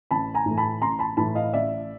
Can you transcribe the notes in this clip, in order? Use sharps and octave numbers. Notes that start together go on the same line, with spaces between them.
A1 A5 B5
G#5 A#5
A2 E3 A3
A5 B5
A1 A#5 C6
A5 B5
A2 E3 A3 A5 B5
D#5 F5
A1 D5 E5